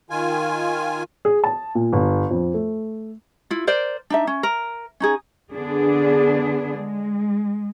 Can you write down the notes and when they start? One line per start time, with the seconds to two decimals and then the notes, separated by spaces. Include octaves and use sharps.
0.10 D#3 F4 G#5
1.25 G#4
1.44 A5
1.75 A#2
1.93 G1
2.31 F2
2.54 A3
3.50 E4 F4
3.67 A#4 C5 D5
4.10 D4 D#4 E5
4.27 C#4
4.43 A#4
5.00 C#4 D#4 G#4
5.52 D3 B3 D4 G#4
6.78 G#3